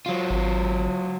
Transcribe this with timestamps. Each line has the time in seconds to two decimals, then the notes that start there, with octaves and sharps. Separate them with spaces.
0.06 F#3 F4
0.30 G#1